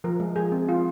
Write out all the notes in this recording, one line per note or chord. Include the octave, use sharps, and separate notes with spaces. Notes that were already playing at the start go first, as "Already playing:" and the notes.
F3 A#4
G#3
F3 G#4
C4
F3 F4